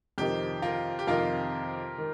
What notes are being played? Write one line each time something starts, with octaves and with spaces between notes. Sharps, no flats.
F2 C3 D#3 C4 D#4 G4
F4 A#4
G4
F2 C3 D#3 C4 D#4 F4 A#4
D#3